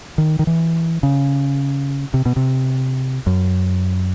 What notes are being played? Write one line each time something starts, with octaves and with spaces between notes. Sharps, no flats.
D#3
D#3
E3
C#3
C3
B2
C3
F#2